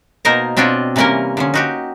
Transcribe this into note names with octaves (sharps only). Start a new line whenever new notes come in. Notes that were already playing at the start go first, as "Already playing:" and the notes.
B2 A#3 D#4 A#4 C5 A#5
B2 C4 D4 F4 C#5 D#5
C3 E3 G3 A#3 C#4 A#4
D3 F3 C#4
D#4 F#4 G4